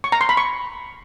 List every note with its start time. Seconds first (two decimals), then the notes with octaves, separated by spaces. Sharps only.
0.04 C#6
0.12 A#5
0.21 C6
0.29 B5
0.37 C#6